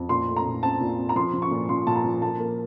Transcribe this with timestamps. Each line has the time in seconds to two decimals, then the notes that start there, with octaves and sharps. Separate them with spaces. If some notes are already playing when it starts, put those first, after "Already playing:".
Already playing: F2
0.09 A#2 C6
0.28 A3
0.37 A#5
0.46 A#2
0.63 C4 A5
0.81 A#2
0.99 C4
1.09 A#5
1.16 F3 C6
1.33 F3
1.42 C#6
1.51 A#2
1.69 F3 C6
1.86 A#2 A5
1.96 A#5
2.05 F3
2.22 A#3 A5
2.40 A#3